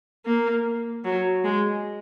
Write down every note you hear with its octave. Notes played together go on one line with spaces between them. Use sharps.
A#3
F#3
G#3